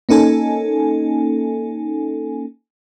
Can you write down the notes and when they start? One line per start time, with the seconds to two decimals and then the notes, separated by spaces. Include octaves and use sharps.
0.09 A#3 C#4 D#4 A4 G#5